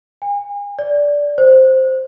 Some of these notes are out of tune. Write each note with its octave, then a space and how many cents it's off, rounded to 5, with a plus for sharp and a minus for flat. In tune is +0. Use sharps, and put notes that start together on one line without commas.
G#5 -40
D5 -10
C5 +0